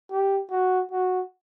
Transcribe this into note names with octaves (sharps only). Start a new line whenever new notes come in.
G4
F#4
F#4